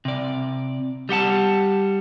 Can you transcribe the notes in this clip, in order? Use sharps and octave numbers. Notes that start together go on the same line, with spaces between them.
C3 D5
G3 G4 F#5 A5